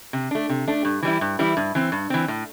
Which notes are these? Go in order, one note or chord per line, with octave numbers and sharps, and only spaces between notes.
C3
A3 D4
C3
A3 D4
G2
E3 G3 E4
G2
E3 G3 E4
G2
E3 C4
G2
E3 C4
A2